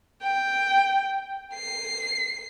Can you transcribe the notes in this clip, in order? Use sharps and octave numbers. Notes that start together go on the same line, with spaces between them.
G5
C7